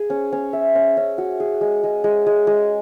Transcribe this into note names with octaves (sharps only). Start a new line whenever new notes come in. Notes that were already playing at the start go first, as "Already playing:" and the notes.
Already playing: G#4
C#4
C#4
E5
C#4
C#4
F#4
G#4
G#3
G#3
G#3
G#3
G#3